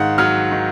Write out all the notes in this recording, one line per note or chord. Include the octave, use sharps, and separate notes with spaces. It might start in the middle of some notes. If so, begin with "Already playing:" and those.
Already playing: G#2 D#3 F5 F#5
F#3 F6
D#3